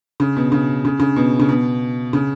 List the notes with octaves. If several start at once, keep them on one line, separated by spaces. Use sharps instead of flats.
C#3
B2
C#3
C#3
C#3
B2
C#3
B2
C#3